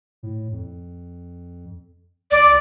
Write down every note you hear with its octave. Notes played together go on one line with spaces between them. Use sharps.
A2
F2
C#2 D5